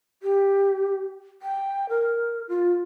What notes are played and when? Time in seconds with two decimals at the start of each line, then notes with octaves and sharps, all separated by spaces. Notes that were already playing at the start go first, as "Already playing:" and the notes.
0.23 G4
1.42 G5
1.89 A#4
2.48 F4